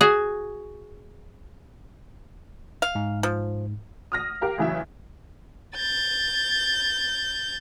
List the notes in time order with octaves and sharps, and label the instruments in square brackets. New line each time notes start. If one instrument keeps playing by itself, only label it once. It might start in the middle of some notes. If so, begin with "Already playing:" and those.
[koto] F#4 G#4
[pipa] F5
[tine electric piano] G#2
[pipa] F3
[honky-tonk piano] D#6 F6 A#6
G4 A#4 F5
A1 C#3 E3 F#3 E5
[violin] G6 A6